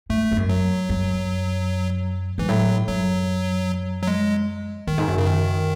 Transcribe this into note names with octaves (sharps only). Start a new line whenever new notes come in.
G#2 A3
G#2
F#2
F#3
F#2
G#2 E3
A2 F#3
F#2 F#3
F#3
G#3
F#2 D#3
G#2
F#2
C#3
D#3